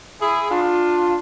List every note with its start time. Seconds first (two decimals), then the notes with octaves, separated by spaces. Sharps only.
0.21 E4 G#4
0.50 D4 F4